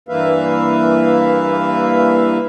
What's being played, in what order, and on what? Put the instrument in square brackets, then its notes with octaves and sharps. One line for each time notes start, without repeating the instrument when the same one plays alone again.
[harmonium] G2 E3 A#3 B4 E5 F5